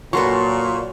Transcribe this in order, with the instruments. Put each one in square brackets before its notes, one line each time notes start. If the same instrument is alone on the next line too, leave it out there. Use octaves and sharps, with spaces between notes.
[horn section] A#2 [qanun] F#3 A4 B4 [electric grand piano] C6 C#6